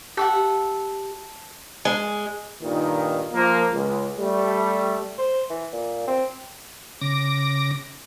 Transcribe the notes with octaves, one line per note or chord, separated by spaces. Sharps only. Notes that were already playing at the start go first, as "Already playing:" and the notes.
G4 A4 E5 F#5
G#3
G2 A#2 D#3
F3 A#3
C#2
G3 A3
C5
E3
A#2
C4
C#3 D6 A#6